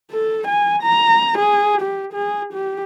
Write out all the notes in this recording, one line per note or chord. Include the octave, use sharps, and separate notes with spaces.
A4
G#5
A#5
G#4
G4
G#4
G4